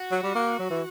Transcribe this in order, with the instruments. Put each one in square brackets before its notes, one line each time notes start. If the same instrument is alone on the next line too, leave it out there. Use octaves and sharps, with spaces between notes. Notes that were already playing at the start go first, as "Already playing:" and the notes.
Already playing: [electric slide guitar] F#4
[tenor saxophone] F#3
G3
A#3
F#3
E3